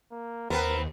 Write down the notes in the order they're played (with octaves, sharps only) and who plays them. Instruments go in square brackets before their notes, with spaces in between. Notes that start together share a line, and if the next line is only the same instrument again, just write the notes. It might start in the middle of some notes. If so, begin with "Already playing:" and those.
[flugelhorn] A#3
[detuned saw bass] D#2 [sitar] B3 C4 B4 [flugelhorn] A#4